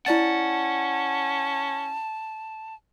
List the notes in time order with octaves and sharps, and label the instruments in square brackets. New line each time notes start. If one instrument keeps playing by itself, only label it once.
[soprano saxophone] C#4 [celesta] E4 D5 A6 [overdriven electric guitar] F#5 [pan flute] A5